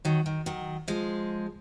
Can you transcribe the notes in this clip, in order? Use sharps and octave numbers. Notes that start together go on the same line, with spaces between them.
D#3 F#3
D#3
D#3 F#3
F3 G#3